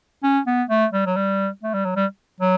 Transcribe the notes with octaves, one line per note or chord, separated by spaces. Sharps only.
C#4
B3
A3
G3
F#3
G3
A3
G3
F#3
G3
F#3